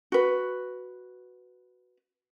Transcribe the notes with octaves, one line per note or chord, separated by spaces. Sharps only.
F#4 B4